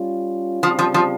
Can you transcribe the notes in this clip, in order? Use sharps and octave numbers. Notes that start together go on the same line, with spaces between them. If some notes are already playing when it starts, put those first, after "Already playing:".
Already playing: G3 C#4 F4
C#3 F3 G3 C4 F4
F3
F3